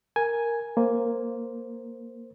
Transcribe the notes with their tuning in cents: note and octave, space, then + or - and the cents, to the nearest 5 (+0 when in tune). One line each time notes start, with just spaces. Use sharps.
A#4 +0 G#5 +0
A#3 +0 C5 +0